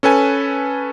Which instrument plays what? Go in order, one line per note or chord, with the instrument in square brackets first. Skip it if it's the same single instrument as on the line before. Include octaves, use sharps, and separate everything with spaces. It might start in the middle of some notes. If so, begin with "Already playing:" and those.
[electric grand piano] C#4 A4 B4 G#5